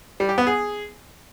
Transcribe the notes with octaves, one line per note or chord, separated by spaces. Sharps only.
G3
G4
B3
G#4